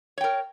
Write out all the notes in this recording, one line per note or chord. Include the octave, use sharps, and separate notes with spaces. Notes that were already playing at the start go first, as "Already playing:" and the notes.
A#4 C#5 G5